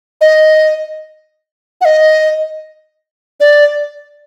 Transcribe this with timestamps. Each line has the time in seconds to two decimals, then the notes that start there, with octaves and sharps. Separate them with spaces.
0.21 D#5
1.81 F#5
1.85 D#5
3.40 D5